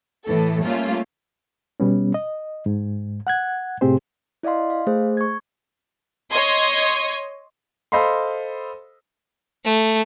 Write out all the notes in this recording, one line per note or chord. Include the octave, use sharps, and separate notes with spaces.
A2 E3 A4
G3 A3 A#3 C#4 F4
B2 G3 B3 C#4
D#5
G#2
F#5 F#6 G#6
A2 C3 C4 G4 G#4 C5
E4 D5 D#5 F5 C6
F5
A3 G#4 C5
C#6 G#6
C#5 D#5 C6 D#6 G#6
A4 C5 D#5 F5 B5 C6
A3